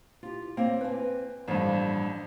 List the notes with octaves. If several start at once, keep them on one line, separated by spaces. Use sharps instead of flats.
F4 G4
A#3 C4 C#5
B4 G#5
A1 G2 F3 A#3